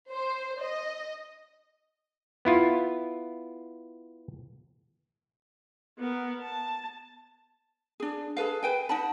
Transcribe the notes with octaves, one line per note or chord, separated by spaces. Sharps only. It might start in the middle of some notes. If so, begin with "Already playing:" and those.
C5
D#5
B3 E4 F4
B3 A#4
A5
D4 G#4
G#4 A4 B4 F5
B4 G5 G#5
D#4 F#5 A5 B5